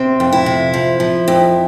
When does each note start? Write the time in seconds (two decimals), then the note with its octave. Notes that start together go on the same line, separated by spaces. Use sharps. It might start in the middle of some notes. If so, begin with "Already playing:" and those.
Already playing: C3 C4
0.20 F2
0.33 E4
0.46 C3
0.74 F3
1.00 F3
1.28 F2